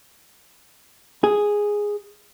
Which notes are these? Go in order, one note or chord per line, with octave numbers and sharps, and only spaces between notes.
G#4